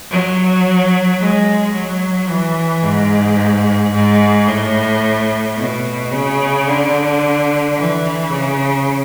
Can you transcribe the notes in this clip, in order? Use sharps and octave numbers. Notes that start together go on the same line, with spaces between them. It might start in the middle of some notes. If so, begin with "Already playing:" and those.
F#3
G#3
F#3
E3
G#2
G#2
A2
B2
C#3
D3
E3
C#3